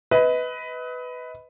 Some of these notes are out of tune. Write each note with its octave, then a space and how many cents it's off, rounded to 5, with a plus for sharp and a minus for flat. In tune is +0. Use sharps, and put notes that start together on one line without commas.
B4 +10 D#5 +35